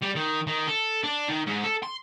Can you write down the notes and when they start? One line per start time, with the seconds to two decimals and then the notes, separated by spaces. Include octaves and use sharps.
0.02 G3
0.15 D#3
0.47 D#3
0.67 A4
1.04 D4
1.28 D#3
1.47 G#2
1.64 A4
1.83 C6